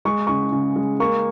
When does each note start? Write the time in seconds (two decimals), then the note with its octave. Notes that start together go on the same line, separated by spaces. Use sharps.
0.05 G#3 C#6
0.27 C#3 C#6
0.52 C#3
0.76 G#3
1.00 A#3 C#6